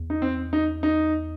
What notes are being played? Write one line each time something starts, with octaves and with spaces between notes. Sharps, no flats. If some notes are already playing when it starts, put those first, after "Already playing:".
Already playing: E2
D#4
C4
D#4
D#4